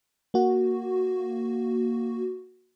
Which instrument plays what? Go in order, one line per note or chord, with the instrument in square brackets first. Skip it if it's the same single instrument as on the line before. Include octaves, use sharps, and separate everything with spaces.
[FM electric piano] A#3 F#4